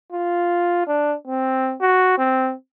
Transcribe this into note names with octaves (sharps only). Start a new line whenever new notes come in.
F4
D4
C4
F#4
C4